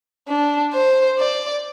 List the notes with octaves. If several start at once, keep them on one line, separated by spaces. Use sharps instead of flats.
D4
C5
D5